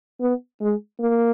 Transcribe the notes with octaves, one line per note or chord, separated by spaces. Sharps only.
B3
G#3
A#3